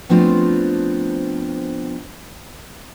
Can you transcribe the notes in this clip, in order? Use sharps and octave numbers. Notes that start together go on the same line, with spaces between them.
F3 A3 B3 C4 D4 F4